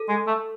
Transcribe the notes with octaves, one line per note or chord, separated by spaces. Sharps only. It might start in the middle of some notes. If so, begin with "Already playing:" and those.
Already playing: A4
G#3
A3